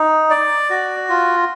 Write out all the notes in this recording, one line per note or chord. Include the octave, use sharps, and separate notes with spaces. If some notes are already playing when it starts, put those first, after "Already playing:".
Already playing: D#4
D5
F#4
F4